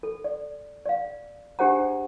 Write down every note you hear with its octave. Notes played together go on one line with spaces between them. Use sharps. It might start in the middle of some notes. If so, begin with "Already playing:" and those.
A4
D5
D5 F5
D4 G4 G#4 C5 F#5 A#5